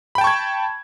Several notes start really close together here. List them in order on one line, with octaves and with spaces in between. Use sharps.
B5 G5 A5 C#6 G#6